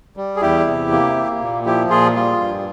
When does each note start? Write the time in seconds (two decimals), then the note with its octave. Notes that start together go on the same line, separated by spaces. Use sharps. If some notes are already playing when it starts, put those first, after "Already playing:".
0.17 G3
0.36 G#4
0.42 E2 E4 G4
0.67 C3
0.91 A#3
1.16 A#3
1.41 A#2
1.66 F3 E4 G4
1.90 A#2 F4 G#4
2.16 G3 F4
2.40 G2